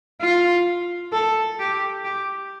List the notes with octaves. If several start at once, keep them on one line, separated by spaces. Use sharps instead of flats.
F4
A4
G4
G4